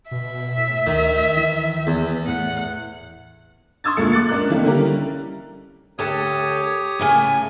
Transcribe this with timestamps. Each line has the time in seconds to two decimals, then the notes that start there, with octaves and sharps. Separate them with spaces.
0.11 B2 E5
0.56 A2
0.87 D2 D#3
1.36 E3
1.87 E2 B3
2.27 A2 F#5
3.84 C6 C#6 D#6 E6 G#6 A6
3.97 D2 A#2 G#3 A#3 A4 C#7
4.12 D6 F#6 A6 C#7
4.29 C#2 D4 A#4 F#6
4.50 C3 D#3 E3 G3 A3 A#3
4.64 D3 G3 C#4 E4 G4 A#4
5.99 D2 G4 A4 C#5 D#6
6.99 A2 C#3 G#5